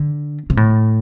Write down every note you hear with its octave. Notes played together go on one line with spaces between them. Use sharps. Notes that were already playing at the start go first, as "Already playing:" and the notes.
Already playing: D3
C3
A2